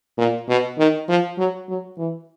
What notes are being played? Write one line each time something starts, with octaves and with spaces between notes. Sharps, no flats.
A#2
B2
D#3
F3
F#3
F#3
E3